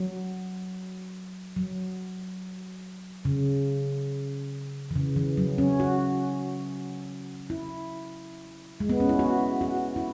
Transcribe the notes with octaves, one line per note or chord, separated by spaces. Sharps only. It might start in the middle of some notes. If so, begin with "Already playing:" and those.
Already playing: F#3
F#3
C#3
E3
C#3
E3
F#3
C#4
F#4
E4
G#3
B3
C#4
E4
F#4
F#4
E4